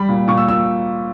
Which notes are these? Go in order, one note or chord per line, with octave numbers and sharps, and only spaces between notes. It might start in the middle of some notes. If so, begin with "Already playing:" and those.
Already playing: G3 B5
A#2
A#2 C#6
E6
A#2 E6